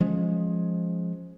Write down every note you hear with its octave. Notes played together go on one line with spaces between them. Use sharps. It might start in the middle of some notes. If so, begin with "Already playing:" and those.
F3 G#3 C#4